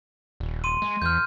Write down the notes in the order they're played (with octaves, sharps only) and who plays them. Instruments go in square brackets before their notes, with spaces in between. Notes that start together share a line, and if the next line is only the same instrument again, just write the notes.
[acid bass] D#1
[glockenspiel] C6 D#7
[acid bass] G#3
[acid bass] E2 [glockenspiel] F6 G6